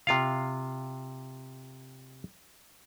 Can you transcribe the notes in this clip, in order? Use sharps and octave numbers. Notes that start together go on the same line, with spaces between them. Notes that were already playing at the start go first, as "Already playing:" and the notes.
C3 F4 F5